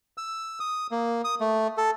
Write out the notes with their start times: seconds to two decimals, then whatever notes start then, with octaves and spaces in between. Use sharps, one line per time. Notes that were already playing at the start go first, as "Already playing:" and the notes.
0.18 E6
0.60 D#6
0.91 A#3
1.24 D#6
1.41 A3
1.77 A4